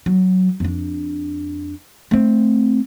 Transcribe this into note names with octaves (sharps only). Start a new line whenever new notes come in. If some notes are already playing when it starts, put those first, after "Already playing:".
F#3
F2 D4
A3 C4